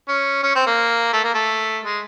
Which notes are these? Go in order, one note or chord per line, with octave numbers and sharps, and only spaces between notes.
C#4
C#4
C4
A#3
A3
A#3
A3
G#3